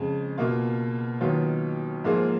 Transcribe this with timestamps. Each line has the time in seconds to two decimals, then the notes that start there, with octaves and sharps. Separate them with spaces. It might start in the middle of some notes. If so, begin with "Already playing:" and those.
Already playing: F2 C#3 G#3
0.38 B2 A#3 F4
1.21 D#2 D#3 F#3 B3 F4
2.04 G#2 F3 A#3 F4 G#4